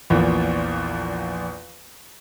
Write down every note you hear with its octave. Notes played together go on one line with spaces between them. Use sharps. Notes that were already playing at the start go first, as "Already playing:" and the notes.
A#1 E2 A#2